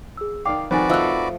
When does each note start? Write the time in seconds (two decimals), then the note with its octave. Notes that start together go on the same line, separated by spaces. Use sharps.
0.17 G#4 E6
0.45 D#3 D5 F5 G5 D6 C7
0.71 F2 G#2 D#3 F#4 B4 C5 D5 G#5
0.90 F3 A3 D#5 E6 F#6